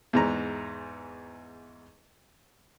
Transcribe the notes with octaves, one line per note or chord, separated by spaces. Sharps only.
E2 G#2 A#5